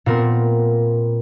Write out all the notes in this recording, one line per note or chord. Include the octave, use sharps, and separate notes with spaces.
A#2 B3 C4 A#4